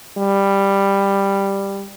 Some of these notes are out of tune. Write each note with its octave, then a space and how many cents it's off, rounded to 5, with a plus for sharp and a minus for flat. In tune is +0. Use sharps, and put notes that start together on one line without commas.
G3 +10